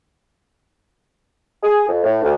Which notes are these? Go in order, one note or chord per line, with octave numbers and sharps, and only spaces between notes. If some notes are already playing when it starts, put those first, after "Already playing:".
G#4
F2
A2
D2